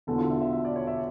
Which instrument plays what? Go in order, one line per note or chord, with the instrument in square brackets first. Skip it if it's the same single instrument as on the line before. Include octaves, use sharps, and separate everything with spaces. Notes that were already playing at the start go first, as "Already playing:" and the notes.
[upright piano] E1 E2 D3 [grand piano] A4
[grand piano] F4
E5
E5
E5
D5
C#5
E5